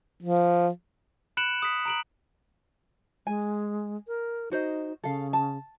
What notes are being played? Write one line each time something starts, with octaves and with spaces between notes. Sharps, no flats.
F3
B5 F#6 C#7 D7 E7 F#7
D#6 B6
A#5 D7 F#7
G#3 G#5
A#4
D#4 F#4 C5 D#5
C#3 A4 F5
A5